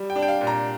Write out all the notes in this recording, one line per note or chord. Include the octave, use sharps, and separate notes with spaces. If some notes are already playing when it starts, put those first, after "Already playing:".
Already playing: G3
G5
D4
G5
F5
A#2
A#5